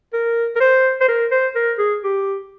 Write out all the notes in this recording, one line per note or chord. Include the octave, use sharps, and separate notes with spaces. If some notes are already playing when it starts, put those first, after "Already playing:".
A#4
A#4
C5
C5
A#4
C5
A#4
G#4
G4